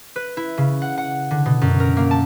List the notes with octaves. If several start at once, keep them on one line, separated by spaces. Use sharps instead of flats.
B4
E4
C#3
F#5
F#5
D3
B2
F#2
A#4
A#3
A5